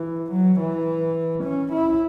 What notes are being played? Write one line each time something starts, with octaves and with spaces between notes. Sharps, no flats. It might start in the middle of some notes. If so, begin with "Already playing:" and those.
Already playing: E3
F#3
E3
C#4
E4